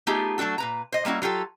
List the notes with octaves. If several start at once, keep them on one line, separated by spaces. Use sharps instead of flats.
A3 B3 D#4 F4 G4 G#4
F#3 A3 D4 F#4 A4
A#2 B4 A#5
C5 D#5
G3 A#3 C#4 E4 F#4
F#3 F4 G4 A4